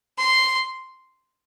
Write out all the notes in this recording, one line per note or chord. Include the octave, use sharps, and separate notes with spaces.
C6